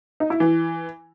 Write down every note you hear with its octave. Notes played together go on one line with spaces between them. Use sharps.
D#4
E4
E3